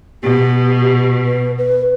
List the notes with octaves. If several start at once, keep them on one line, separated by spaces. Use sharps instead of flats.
B2 G4
B4
B4